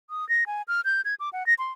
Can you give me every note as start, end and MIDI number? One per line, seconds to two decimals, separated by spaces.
0.10 0.27 87
0.29 0.44 94
0.47 0.62 80
0.68 0.81 89
0.85 1.01 91
1.05 1.15 92
1.20 1.29 86
1.33 1.46 78
1.47 1.54 94
1.59 1.72 84